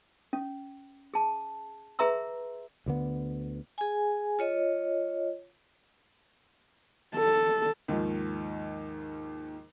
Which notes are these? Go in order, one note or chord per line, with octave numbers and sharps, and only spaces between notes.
C#4
G#4 A5
G#4 B4 E5 A#5 C6 E6
D2 D3 B3
G#4 G#5
F4 C#5 D#5
A4
D#2 G#2 D#3 F3